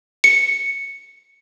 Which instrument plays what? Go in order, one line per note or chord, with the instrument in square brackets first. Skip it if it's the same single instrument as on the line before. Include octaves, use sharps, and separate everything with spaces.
[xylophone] C#7